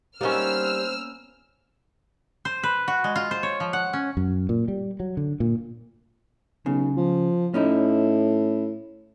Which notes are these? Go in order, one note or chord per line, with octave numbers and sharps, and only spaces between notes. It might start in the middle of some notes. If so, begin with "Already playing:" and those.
G3 A#3 B3 C#4 D#4 C5 E6 F6
C5
B4
F#4
G#3
F4
C5
C#5
F3
F#5
C#4
F#2
A#2
G3
F#3
D3
A#2
B1 C#3
F3
A2 C#4 D#4 E4